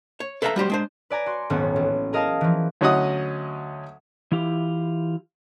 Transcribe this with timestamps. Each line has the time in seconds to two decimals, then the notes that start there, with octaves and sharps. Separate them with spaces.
0.20 C#5
0.42 A4 B4 E5 F5 A5 A#5
0.56 G3 F#4 G4 C5
0.70 G#3 D4 C5
1.10 B4 D5 G#5 A#5
1.26 F#4 C6
1.50 D#1 G#1 F#3 B3 C#4 C#5
1.76 A1
2.13 G#4 A#4 D#5 F5 A5 A#5
2.41 E3 F3
2.81 D2 F#3 C#4 D#5 F#5 D#6
4.32 E3 E4 F4 G4